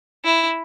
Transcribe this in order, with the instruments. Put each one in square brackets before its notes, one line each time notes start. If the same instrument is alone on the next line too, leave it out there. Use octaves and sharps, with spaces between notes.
[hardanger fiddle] E4